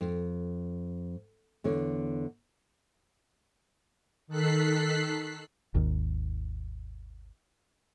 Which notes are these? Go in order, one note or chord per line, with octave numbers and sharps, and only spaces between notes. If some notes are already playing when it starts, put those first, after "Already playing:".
F2
E2 D3 C#5
D#3 A4 F#6 B6 C7
G#1 D#2 G#2 D#3